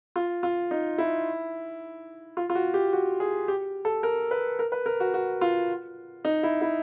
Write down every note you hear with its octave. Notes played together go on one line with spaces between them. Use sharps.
F4
F4
D#4
E4
F4
F4
F#4
G4
F#4
G#4
G4
A4
A#4
B4
A#4
B4
A#4
F#4
F#4
F4
D#4
E4
E4